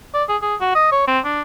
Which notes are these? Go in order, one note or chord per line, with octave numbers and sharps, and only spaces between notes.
D5
G#4
G#4
F#4
D#5
C#5
C4
D4